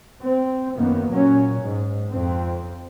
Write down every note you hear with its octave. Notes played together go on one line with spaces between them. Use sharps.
C4
F#2 D#3 A#3 B3
A#2 F#3 C#4
G#2
F2 C4